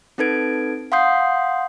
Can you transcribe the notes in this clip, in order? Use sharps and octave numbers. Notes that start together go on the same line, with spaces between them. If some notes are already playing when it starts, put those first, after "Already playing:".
C4 D#4 A4 B4 G#6 D7
F5 F#5 C6 D#6 G6 C7